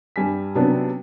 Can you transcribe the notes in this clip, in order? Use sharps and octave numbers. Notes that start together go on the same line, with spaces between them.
G2 G3 G#5 B6
C3 F#3 B3 C#4 D4